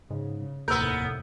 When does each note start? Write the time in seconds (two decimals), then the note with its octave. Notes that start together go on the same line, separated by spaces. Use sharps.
0.10 G#2 C#3
0.68 F1 D#2 A2 B3 A#4 E6 G6